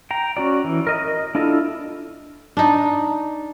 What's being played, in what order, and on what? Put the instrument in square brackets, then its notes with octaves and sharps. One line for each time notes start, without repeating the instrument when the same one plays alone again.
[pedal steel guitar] G5 A#5
C#4 F#4 D5
E3
A#4 D#5
D#5
D4 E4 F4 A4 D#5
[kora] D4 D#4